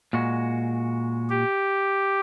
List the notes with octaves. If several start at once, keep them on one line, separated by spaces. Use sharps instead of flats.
A#2 G#3 F#4
G4